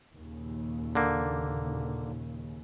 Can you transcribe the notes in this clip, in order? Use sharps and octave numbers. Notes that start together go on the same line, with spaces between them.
D#2 A#2 C#3
D3 A#3